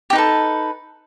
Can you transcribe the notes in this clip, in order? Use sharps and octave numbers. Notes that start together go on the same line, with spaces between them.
D#4 G4 A4 B4